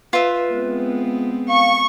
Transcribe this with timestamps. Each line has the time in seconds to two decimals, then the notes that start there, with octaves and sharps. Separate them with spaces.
0.13 F4 B4 E5
0.51 G#3 B3 C4
1.48 F5 C#6